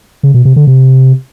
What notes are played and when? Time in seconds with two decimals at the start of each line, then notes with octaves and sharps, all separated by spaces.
0.23 C#3
0.34 B2
0.45 C3
0.56 D3
0.67 C3